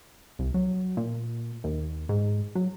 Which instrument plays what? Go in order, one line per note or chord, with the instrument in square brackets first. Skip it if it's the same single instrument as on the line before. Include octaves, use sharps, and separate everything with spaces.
[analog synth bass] C2
F#3
A#2
D#2
G#2
F#3